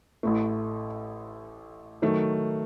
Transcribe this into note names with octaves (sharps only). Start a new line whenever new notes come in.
A1 A2 A3
D#3 F#3 A3